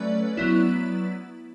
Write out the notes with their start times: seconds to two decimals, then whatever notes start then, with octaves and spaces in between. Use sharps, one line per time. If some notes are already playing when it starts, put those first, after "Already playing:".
Already playing: F#3 A3 C#4 B4 D5
0.37 F#3 B3 E4